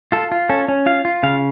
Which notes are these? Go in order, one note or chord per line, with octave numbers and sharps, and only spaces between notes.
F4 A4
F4
C#4 A4
C#4
F4 F5
F4
C#3 F5